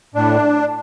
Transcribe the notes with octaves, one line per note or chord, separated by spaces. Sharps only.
A2 D4